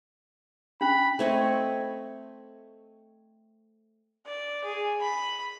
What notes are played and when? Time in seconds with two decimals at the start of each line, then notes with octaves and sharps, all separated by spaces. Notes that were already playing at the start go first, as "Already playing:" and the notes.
0.81 C#4 D4 B5
1.19 A3 C4 C#5 D#5
4.27 D5
4.64 G#4
5.01 B5